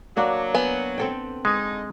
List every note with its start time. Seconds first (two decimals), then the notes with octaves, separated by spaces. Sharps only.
0.17 F#3 A#3 D4 F#4
0.54 B3 G#5
0.98 C4 A4 G5
1.45 D3 G#3 D#4